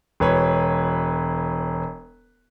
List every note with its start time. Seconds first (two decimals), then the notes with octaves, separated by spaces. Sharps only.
0.20 E1 B4 C#5